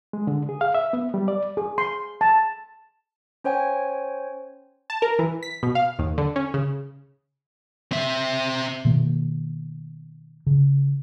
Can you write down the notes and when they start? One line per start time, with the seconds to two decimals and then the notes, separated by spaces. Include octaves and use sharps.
0.13 G#3
0.27 D3
0.49 G#4
0.61 F5
0.75 E5
0.93 B3
1.14 G3
1.28 D5
1.57 G#4
1.78 C6
2.21 A5
3.44 C#4 C5 C#5 G5 G#5
4.90 A5
5.02 A#4
5.19 E3
5.43 B6
5.63 B2
5.75 F5
5.99 D#2
6.18 D3
6.36 C#4
6.54 C#3
7.92 C4 E5
8.85 B2 D#3 A#3
10.47 C#3